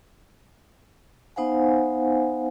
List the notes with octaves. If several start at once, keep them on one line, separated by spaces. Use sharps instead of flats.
B3 D#4 C5 F5 F#5 G#5